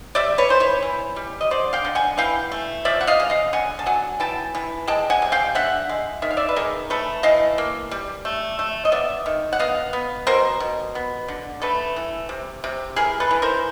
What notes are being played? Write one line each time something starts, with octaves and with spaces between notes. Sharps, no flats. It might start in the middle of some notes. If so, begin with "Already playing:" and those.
G3 D5 E5
B4 C#5
E3 C5
B4 C#5
E3
G3
D#5
D3 C5 D5
F5 G5
D3
F#5 G#5
E3 F5 G5
A3
F3 D5 E5
F#5
D#5 F5
C#3
D#5 F5
D3 F#5 G#5
A5
F#3 F#5 G#5
E3 G5 A5
E3
G#3 G5 A5
F#5 G#5
C3
F5 G5
D3 E5 F#5
G#3
D#3 E5
F5
D5 E5
B4
D#3 G#4 A#4
A3 A4 B4
E3 D#5 F5
A#3
G3
A3
A3
D#5
B3 D5 E5
D#3
F#5
B3 D#5 F5
B3
B2 A#4 C5
B2
B3
D3
A3 A4 B4
E3
C3
C3
E3 G#4 A#4
A4 B4
E3
A#4 C5